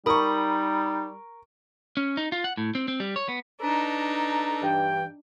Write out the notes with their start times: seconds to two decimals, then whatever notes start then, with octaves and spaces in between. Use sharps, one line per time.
0.06 G3 D#4 A#4 B5 C#6 D#6
1.97 C#4
2.17 D#4
2.32 F4
2.44 F#5
2.57 A2
2.75 C4
2.88 C4
3.00 G3
3.16 C#5
3.29 B3
3.61 D4 D#4 A4 B4 A#5
4.63 G2 E3 G5